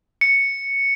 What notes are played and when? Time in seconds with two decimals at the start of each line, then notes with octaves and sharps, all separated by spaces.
0.21 C#7